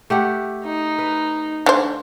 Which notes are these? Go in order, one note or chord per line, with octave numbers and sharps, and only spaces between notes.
A3 G4 F#5
D#4
B4
D3 C5